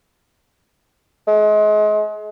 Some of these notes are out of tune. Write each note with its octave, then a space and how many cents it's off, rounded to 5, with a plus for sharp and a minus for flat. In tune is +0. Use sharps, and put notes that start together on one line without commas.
G#3 +30